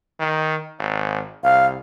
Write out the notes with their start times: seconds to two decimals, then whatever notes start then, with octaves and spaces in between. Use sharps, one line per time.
0.20 D#3
0.79 G#1
1.43 C2 F5